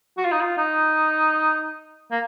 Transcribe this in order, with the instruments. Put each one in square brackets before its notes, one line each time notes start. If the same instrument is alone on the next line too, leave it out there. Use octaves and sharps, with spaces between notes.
[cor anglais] F#4
F4
D#4
F4
D#4
A#3